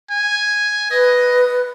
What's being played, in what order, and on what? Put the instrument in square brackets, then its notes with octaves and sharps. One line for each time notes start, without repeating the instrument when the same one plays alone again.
[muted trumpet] G#5
[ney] B4 [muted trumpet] D#5